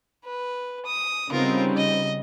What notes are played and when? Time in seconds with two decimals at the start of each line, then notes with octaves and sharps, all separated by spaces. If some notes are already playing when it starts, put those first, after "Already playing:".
0.25 B4
0.85 D#6
1.32 C#3 G3 B3 C4 D#4 F4 A#4
1.76 D#5